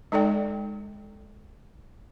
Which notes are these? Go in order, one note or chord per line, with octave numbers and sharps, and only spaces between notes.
G#3 D#4 A4 D5 G5